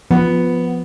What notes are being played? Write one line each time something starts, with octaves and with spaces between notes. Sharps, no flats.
F3 B3